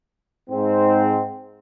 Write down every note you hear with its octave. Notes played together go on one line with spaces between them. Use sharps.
G#2 C4